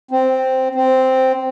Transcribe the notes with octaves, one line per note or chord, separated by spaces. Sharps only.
C4
C4